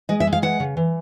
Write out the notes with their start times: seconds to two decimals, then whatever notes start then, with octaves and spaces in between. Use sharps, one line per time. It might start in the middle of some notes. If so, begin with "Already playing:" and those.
0.09 G#3 D#5
0.20 E5
0.27 G#3
0.33 F5
0.42 E3 F#5
0.60 C#3
0.77 E3